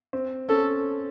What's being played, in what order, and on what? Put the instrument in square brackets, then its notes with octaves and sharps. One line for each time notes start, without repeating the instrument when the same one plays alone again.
[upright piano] C4
[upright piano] C#4 [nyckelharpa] A4